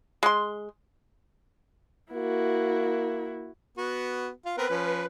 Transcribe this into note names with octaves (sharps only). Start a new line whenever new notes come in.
G#3 C6
A#3 E4 F#4
B3 F#4
F4 F5
B3 C4 A#4 B4
F3 C#4